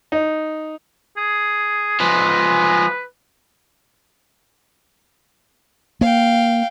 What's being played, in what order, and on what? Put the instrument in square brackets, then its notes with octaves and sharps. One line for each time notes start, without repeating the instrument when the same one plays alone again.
[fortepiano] D#4
[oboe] G#4
[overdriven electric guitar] F3 G#3 [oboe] B4
[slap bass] A#3 [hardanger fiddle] F5 G5